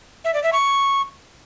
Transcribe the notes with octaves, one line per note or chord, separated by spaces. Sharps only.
E5
D5
E5
C#6